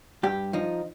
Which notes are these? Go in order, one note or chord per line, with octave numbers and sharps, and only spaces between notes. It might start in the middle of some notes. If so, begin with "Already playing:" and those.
G2 G4
F3 D#4